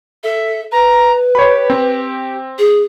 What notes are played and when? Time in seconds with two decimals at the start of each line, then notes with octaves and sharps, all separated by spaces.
0.23 A4 E5
0.72 B4 A#5
1.35 G4 C#5 B5
1.70 C4
2.58 G#4